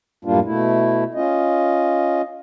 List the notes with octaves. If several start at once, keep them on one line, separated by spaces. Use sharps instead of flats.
F#2 A2 G3 A#3 D4 F4
B2 A3 E4
C#4 F4 D#5